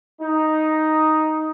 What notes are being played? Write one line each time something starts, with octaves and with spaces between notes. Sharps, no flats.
D#4